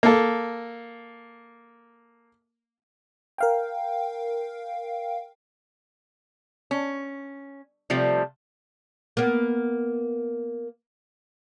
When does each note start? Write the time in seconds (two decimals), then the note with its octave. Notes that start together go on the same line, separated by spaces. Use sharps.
0.03 A#3 A4
3.38 A#4 F5 G5
6.71 C#4
7.90 C3 F3 G3 A3
9.17 A#3 B3